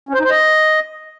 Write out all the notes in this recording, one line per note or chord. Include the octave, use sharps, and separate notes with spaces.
C#4
C5
D#4
C5
D#5